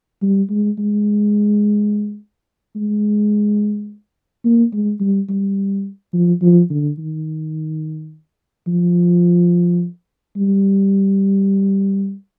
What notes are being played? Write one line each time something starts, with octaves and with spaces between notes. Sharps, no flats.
G3
G#3
G#3
G#3
A#3
G#3
G3
G3
F3
F3
D3
D#3
F3
G3